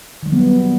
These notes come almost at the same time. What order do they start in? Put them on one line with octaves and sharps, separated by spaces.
D#3 G3 F#3 B3